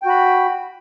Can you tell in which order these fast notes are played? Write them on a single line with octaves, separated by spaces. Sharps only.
G5 F#4 B5